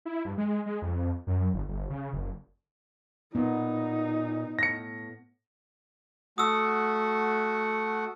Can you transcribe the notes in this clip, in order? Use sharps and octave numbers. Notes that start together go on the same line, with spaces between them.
E4
G2
G#3
G#3
F2
F#2
G1
G1
C#3
F#1
A#2 B3 D#4
A2 A#6 C#7
A3 F#4 F#5 D#6 E6